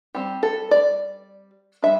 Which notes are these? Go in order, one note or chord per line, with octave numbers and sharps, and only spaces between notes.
G3 C4 G4
A4
D5
G3 D4 E5